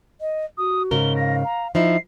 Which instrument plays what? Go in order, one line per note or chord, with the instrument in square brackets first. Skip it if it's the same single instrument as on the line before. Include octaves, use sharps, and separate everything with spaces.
[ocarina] D#5
[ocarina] F#4 [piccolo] D#6
[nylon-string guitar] G#2 C#3 A#4 [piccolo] G7
[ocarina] F5 [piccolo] A#6
[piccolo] A#5
[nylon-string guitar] F3 D#4 E4 [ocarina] E5 [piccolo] C7